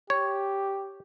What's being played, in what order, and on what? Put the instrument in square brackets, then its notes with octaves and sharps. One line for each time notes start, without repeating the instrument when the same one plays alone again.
[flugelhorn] G4 [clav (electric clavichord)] C#5